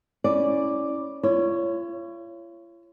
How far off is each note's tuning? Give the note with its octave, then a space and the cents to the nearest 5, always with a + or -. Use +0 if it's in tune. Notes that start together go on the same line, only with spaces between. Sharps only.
C#4 +0 E4 -15 D5 +0
F4 -45 C#5 +0